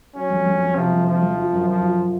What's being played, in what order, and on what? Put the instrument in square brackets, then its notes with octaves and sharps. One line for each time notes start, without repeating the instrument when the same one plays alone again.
[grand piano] F#3 [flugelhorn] C#4
[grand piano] F2
F2
F2
[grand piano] C3 [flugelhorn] F3
[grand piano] F2
[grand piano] F2 [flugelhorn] F3
[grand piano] F2
F4
F#2
[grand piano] F#2 [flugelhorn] F3
[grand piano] F4